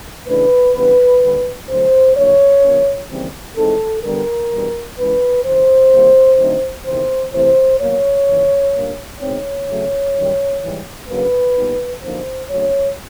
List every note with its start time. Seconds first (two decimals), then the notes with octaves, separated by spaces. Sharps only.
0.28 C#3 E3 A3 D4 B4
0.75 C#3 E3 G3 B3 D4
1.23 D#2 D3 G3
1.69 D2 D3 F#3 A3 C5
2.16 D3 F#3 A#3 D4 C#5
2.63 C#3 F3 A#3 C#4
3.10 D#2 C#3 E3 G3 C4
3.57 A2 E3 G#3 C4 D#4 A4
4.04 D3 G3 B3 A#4
4.51 E2 B2 G3 B3 D4
4.98 G#2 E3 G#3 C#4 B4
5.45 F#2 C#3 E3 C5
5.92 C3 D#3 G3 A#3
6.39 D3 F#3 A3 C4 D#4
6.86 E2 C3 D#3 C5
7.33 C3 E3 A3 C5
7.80 B2 F#3 A#3 C#5
8.27 D#2 C#3 E3
8.74 A#2 G3 A#3 D4
9.21 B2 G#3 C4 D#4 C#5
9.68 C#3 F#3 A3
10.15 F#2 D#3 G3
10.62 G#2 E3 G3
11.09 C#3 F#3 A#3 D4 B4
11.56 A#2 G3 B3 D#4
12.02 F#2 D3 F3 A#3 D#4 C5
12.50 C#3 F#3 A3 D4 C#5